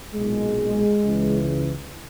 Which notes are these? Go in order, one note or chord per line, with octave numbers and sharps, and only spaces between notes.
B1 A#2 G#3
C#2 C#3 E3